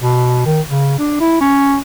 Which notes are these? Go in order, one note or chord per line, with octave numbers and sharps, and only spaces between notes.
B2
D#3
C#3
D4
E4
C#4